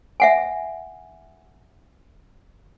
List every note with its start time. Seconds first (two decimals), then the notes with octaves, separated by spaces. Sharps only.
0.20 E5 F#5 G#5